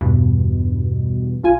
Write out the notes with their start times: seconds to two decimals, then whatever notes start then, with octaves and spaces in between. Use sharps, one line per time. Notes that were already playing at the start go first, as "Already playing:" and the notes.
0.01 E2 G2 B2
1.43 A#1 F4 G#5